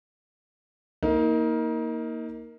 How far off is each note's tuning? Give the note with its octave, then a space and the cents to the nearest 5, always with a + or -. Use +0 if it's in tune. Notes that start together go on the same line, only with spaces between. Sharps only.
A#3 +0 D#4 +30 A#4 +0